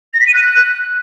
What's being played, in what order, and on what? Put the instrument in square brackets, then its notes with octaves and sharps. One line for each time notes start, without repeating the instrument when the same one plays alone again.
[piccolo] A#6
B6
D#7
F#6